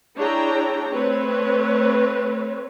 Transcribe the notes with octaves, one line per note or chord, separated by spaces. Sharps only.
D4 E4 G#4 C#5 G5 A#5
A3 C4 B4 C#5